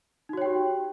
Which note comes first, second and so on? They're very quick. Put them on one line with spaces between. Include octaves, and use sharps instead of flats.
D#4 F#4 C#5 G5 G4